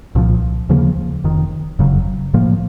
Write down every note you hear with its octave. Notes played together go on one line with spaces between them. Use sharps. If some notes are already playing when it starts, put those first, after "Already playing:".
C2 A#2 F3
D#2 C#3 F3 A#3
F1 F2 D#3
F#1 F2 C#3 F#3
A2 F3 A#3